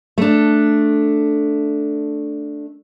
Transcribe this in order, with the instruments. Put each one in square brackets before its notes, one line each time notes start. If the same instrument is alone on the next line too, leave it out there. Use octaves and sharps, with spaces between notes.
[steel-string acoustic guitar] A3 D4